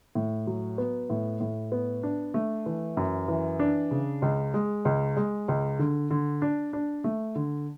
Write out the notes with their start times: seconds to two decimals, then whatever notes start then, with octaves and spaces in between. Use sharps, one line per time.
0.15 A2
0.47 F#3
0.78 B3
1.10 A2
1.41 A2
1.72 B3
2.03 D4
2.34 A3
2.66 E3
2.97 F#2
3.28 E3
3.60 D4
3.91 C#3
4.22 C#2
4.54 G#3
4.85 C#2
5.17 G#3
5.48 C#2
5.79 D3
6.11 D3
6.42 D4
6.73 D4
7.04 A3
7.35 D3